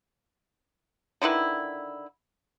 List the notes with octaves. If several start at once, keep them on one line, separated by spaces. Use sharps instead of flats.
D3 D#3 E4 B4